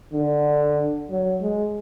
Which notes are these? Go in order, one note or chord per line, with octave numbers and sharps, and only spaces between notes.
D3
F#3
G#3